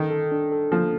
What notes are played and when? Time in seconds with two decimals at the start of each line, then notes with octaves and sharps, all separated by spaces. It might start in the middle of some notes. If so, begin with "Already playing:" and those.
Already playing: D#3 A4
0.11 A4
0.32 D4
0.52 A4
0.72 F3 A#3